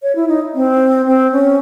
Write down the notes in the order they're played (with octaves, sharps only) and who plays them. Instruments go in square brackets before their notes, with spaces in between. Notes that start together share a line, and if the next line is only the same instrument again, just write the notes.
[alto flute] C#5
E4
D#4
C4
C4
C#4